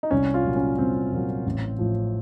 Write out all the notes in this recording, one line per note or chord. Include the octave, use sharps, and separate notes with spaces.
D#4
C2 C#4
F4
A#2 F#3
C#4
C2 C4
A#2 F#3
A1
A2 F3